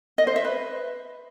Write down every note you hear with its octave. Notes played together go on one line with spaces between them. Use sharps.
D#5
C5
E5
B4